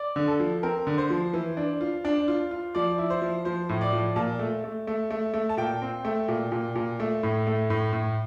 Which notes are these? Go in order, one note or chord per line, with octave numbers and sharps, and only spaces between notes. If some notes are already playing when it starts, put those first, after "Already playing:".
Already playing: D5
D3
A4
F3
C4 A#4
D3
C5
F3
E3
D4
F4
D4
F4
F4
F3 D5
E4
C5
F3
F3 C5
A2
D5
F3
A#2 A5
A3
A3
A3
A3
A3
A5
A#2 G5
C4
A3
A#2
A#2
A#2
A3
A2
A3
A2
A2